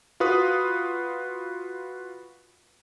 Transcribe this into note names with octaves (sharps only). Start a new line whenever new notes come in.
F4 F#4 B4 D#6